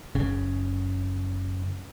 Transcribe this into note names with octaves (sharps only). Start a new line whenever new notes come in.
F#1 C#3